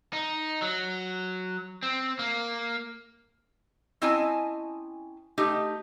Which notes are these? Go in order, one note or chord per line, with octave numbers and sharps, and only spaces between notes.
D#4
F#3
C4
A#3
C4 C#4 E4 D#5 G#5 A5
A3 D#4 G4